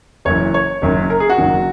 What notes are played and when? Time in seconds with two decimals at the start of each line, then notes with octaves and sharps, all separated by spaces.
0.25 F#1 F#2 E3 C#5
0.54 C#5
0.82 F#1 F#2 D#3
1.10 A#4
1.20 G#4
1.30 F#4
1.38 F#1 F#2 D#3